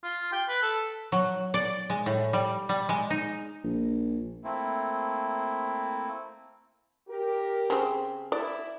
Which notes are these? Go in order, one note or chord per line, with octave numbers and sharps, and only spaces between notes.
F4
G5
B4
A4
F#3
D5
G#3
A2
G3
G3
G#3
D#4
A#1
A3 A#3 C4 E4
G4 A#4
C#3 C4
E4 D5